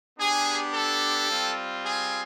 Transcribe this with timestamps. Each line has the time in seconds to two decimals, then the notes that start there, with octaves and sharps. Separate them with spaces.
0.18 B3 D4 G4 G#4
0.73 A4
1.29 G3 C4 F4
1.84 G#4